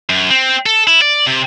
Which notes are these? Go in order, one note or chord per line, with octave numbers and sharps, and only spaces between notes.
F#2
C4
A4
E4
D5
C3